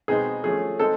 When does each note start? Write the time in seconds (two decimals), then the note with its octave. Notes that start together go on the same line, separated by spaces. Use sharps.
0.08 B2 G#3 C4 D#4 G#4
0.44 F3 A3 C#4 G#4
0.79 G#3 C4 D#4 A4